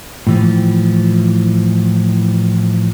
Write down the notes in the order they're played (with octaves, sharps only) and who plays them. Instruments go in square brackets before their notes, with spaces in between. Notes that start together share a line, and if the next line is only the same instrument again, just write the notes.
[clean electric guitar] A2 E3 F3